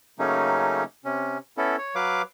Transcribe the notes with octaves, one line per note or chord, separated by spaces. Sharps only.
C#3 F#3 A3 A#3 C#4 D#4
C3 C#4
B3 C#4 E4 A4
C#5
F#3 B4 F5 D6